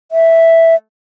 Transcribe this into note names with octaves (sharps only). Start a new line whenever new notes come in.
E5